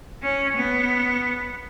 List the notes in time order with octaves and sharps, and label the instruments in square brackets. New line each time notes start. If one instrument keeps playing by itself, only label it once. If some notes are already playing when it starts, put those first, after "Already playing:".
[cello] C#4
B3